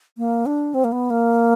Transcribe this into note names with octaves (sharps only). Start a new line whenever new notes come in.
A#3
D4
C4
A#3
B3
A#3